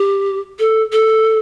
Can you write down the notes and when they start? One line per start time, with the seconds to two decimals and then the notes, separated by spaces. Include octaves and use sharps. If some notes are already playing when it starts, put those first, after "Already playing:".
Already playing: G4
0.59 A4
0.92 A4